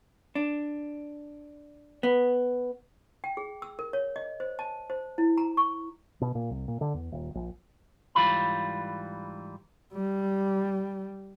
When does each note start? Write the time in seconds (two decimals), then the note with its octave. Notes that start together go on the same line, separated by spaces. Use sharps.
0.35 D4
2.03 B3
3.24 G5
3.37 G#4
3.62 E6
3.79 A#4
3.93 C#5
4.16 D#5
4.40 C5
4.59 A5
4.90 C5
5.18 E4
5.38 A#5
5.57 C#6
6.21 B2
6.35 A#2
6.50 C2
6.68 A#2
6.81 D3
6.94 E2
7.12 D#1
7.35 A#1
8.15 G#2 E3 G3 F4 B5
9.93 G3